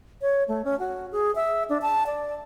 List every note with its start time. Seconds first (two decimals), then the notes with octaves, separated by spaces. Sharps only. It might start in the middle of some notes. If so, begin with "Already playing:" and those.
0.22 C#5
0.48 A3
0.64 C#4
0.79 F#4
1.12 G#4
1.35 E5
1.69 D4
1.82 A5
2.07 D5